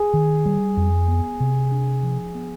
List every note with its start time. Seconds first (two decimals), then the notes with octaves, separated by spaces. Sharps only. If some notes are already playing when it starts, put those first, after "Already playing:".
Already playing: G#4
0.14 D#3
0.46 G3
0.77 F2
1.08 B3
1.40 C3
1.72 D4
2.03 F3
2.35 B3